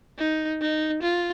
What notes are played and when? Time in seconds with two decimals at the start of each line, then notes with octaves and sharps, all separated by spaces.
0.18 D#4
0.61 D#4
1.03 F4